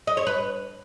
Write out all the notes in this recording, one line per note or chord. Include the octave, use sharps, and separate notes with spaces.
D#5
C#5
B4